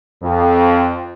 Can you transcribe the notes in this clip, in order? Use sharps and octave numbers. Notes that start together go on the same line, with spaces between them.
F2